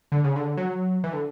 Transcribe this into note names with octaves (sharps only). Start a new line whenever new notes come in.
D3
C#3
D3
F#3
E3
D3